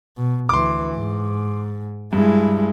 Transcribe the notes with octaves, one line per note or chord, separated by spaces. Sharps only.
B2
D2 E3 C6 D6
G#2
G2 G#3 E4